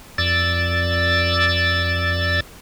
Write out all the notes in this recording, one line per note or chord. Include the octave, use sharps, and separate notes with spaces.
F2 D5 E6 A6